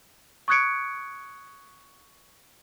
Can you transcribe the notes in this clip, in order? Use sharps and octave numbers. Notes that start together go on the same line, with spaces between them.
C#6 D#6 F#6 G#6 C#7 D7